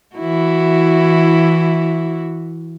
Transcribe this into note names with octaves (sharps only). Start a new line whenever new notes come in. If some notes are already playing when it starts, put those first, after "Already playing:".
E3 E4 F#4